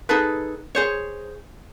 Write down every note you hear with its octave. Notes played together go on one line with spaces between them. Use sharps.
D#4 G#4 A4 B4
G#4 C5 C#5